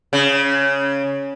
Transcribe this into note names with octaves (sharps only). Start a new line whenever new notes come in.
C#3